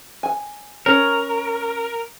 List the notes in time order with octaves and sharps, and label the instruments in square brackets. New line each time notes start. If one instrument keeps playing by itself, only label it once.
[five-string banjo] G#5
[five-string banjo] C#4 C#5 [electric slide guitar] A#4